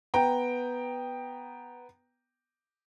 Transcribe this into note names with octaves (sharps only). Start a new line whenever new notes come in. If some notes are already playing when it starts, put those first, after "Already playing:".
B3 G5 A#5